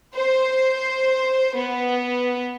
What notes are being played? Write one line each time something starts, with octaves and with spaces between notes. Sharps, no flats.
C5
B3